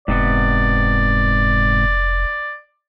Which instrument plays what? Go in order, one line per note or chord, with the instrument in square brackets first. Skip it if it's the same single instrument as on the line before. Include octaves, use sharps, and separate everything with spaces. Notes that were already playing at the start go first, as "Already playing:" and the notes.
[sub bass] F1 [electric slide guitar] G#2 C3 B3 [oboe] D5